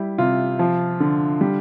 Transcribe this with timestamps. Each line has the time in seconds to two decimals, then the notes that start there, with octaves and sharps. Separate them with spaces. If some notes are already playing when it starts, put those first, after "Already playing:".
Already playing: G3 E4
0.18 C3 F4
0.59 F3
1.00 D3
1.41 G3